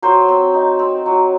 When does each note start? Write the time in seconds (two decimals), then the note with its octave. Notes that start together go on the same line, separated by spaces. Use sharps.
0.02 F#3 C5
0.28 C4
0.54 D#4
0.79 C4
1.06 F#3